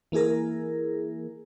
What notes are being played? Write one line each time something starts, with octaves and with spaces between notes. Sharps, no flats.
E3 A#3 E4 G#4 A#4